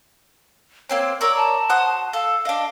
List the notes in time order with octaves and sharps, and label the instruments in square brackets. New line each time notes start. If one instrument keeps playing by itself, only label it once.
[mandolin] A#3 C4 C6 [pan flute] C#5
[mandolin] A#4 C#5 D5 [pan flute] E6
[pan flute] A5
[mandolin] F#4 C5 D#6
[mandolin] A4 [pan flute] F5
[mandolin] D4 D#5 [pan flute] F5